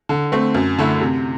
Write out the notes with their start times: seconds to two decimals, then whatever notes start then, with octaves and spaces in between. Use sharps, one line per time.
0.09 D3
0.32 A3 C4
0.54 F#2
0.79 D3 A3 E4
1.01 C3